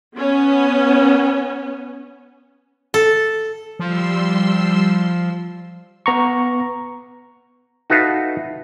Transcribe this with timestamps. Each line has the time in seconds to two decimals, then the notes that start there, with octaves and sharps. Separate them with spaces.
0.14 B3 C#4
2.94 A4
3.79 F3 G3 C6 E6
6.06 B3 A#5 C#6
7.90 D#4 F#4 A4 B4 E5 F5